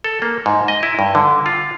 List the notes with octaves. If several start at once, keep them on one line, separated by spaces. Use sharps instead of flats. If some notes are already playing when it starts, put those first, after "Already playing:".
A4
A#3
G#2
D#5
E4
G2
D3
F4